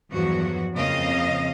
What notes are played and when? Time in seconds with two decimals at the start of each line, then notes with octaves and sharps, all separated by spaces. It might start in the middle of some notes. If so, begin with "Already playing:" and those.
0.11 E2 G2 F3 F#3 F#4
0.74 F2 C#3 A#3 C4 D#5 F5